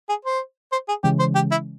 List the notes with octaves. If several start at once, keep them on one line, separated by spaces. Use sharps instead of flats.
G#4
C5
C5
G#4
C#3 E3 G#3 C#4 G4
C5
G4
E4